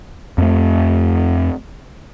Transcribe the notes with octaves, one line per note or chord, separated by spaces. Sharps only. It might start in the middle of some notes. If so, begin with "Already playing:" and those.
F2 A3